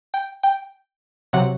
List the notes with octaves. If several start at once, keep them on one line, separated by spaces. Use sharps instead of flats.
G5
G5
C3 F#3 F#5